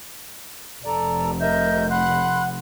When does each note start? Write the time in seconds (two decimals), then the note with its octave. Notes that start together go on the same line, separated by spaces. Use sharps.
0.85 F1 A4 D5 A#5
1.40 A#4 D#5 E5 G6
1.90 F#5 B5 C6 F#6